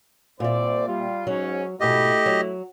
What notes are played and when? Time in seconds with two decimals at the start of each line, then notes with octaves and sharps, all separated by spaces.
0.40 C2 A#2 C5 D5 E5
0.87 G3 F4
1.27 G#2 F#3 C#4
1.81 G#2 B2 A3 E4 G4 D#5
2.26 F#3